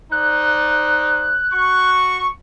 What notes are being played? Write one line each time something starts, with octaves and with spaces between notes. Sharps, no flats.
D#4 C5 D5 F#6
F#4 C#6